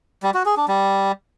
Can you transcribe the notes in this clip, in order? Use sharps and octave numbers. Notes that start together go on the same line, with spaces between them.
G3
F#4
G#4
D4
G3